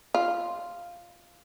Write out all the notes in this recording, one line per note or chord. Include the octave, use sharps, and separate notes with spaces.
F4